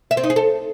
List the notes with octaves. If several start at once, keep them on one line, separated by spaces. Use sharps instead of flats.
E5
C4
D#4
G#4
A4